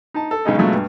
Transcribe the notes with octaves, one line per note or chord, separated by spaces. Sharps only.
D#4 A5
A4
B1 C#3 G#3 D#4 D#5
B2 F#3 G#3 A3 F4
G2